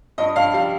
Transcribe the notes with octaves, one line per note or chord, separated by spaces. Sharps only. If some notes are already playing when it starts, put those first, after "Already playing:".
G2 D#5
G2 F5
G3 F5